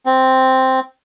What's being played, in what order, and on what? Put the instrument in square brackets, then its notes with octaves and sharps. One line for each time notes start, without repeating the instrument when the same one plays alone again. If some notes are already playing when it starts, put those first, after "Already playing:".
[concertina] C4